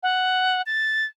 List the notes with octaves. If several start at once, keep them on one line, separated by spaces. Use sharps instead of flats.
F#5
A6